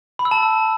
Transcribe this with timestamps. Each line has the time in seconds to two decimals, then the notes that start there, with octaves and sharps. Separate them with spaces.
0.19 B5
0.25 E6
0.31 A5